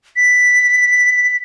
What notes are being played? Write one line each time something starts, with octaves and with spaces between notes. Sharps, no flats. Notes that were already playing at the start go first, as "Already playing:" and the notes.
B6